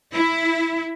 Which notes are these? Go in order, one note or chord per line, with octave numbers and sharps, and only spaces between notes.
E4